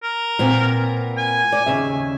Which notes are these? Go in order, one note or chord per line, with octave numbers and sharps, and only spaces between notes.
A#4
A#2 B3 C4
G#5
D5
D#2 C#3 E5